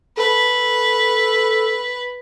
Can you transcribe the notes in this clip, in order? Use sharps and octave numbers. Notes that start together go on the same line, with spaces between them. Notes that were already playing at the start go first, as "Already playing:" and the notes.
A4 B4